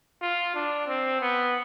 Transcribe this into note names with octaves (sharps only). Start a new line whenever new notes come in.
F4
D4
C4
B3